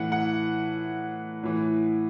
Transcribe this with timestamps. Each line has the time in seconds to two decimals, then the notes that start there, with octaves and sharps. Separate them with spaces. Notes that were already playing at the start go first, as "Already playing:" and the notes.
Already playing: A2 E3 F#5
0.12 F#5
1.43 A2 E3